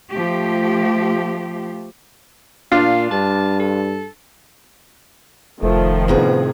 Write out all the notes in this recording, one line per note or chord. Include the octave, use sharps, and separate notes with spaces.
F3 A3 G4
A#2 D4 F4 F5
G2 A5
A4
F1 D#3 F3 A3
A2 C3 B3 G#4